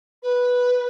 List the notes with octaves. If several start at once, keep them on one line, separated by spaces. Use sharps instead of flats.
B4